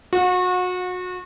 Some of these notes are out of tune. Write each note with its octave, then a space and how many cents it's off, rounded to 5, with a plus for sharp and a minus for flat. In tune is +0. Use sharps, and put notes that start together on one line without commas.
F#4 -30 F#5 -40